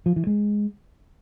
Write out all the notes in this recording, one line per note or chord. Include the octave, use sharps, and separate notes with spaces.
F3
E3
G#3